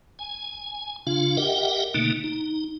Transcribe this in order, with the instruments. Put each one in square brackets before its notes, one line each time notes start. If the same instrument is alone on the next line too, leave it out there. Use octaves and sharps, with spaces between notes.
[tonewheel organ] G#5
C#3 D4 F4 F5
G4 A#4 D#5 E5 F#5 G5
B2 D3 A3 A#3 D#4
D#4